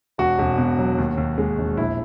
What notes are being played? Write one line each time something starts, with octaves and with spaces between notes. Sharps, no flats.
E1 F#4
E1
B2
F#3
D#2
D#2
G#3
E1
A#1 E4